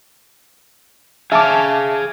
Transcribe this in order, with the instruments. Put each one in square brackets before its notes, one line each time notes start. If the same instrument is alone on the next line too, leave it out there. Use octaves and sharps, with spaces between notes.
[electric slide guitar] G#4 F5 [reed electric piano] E5 A5 D6